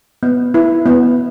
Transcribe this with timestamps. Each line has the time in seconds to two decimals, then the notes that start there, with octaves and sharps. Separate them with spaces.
0.23 B3
0.54 E4 B4
0.86 B3